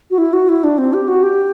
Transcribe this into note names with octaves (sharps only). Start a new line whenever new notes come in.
F#4
E4
F#4
E4
D4
C4
G4
F#4
G4